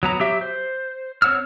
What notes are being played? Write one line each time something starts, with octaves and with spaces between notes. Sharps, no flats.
F#3 B3 A#5
F#3 G4 E5
C5
C4 C#5 F#5 E6 F6